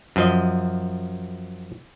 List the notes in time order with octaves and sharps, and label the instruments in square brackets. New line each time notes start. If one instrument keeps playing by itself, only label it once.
[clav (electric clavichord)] F#2 F3 D#5